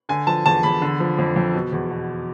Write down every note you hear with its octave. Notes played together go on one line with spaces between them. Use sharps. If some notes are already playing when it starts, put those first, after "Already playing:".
D3 G#5
F3 A5
E2 A5
E2 B5
D3
F3
F2
F2
B2
E2
B2